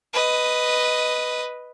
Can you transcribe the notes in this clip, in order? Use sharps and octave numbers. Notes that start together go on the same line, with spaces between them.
B4 D#5